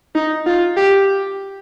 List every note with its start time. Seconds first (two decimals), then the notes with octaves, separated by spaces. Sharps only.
0.15 D#4
0.46 F4
0.77 G4